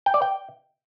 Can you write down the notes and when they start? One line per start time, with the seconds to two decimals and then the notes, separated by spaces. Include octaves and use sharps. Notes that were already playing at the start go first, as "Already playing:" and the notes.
0.06 G5
0.14 D5
0.22 G5